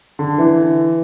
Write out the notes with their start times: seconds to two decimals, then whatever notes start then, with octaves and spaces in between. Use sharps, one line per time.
0.19 D3
0.38 E3